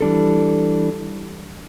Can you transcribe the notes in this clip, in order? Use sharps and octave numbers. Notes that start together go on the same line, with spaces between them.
E3 G3 D4 A4